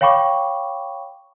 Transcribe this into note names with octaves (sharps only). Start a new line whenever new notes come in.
C#5 F5 G5 B5 C#6 D6